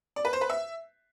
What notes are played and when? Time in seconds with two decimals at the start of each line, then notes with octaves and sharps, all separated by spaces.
0.16 D5
0.25 B4
0.33 C5
0.41 B4
0.50 E5